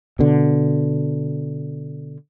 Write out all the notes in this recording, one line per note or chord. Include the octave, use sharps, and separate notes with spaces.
B2 D3